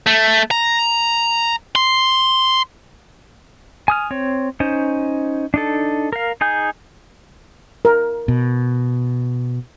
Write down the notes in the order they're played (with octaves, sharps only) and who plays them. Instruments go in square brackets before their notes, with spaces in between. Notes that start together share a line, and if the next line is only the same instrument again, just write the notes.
[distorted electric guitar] A3
A#5
C6
[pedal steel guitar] G#5 D#6 F6
C4 C#5
C#4 D#4 C5
D4 D#4 A4
A#4 F5
D#4 G#4 G#5 G6
[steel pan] A#4
[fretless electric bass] B2